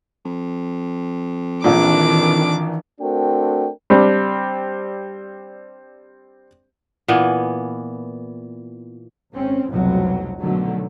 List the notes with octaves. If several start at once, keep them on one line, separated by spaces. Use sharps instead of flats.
F2
A#1 A#2 D#3 E3 D4 D6
A3 C4 D4 F#4 A#4 G5
G3 C4 D4
A#2 E3 B3
G#1 C4 C#4
F1 C2 F2 B2 F#3
B2 D3 D#3 F#3 A3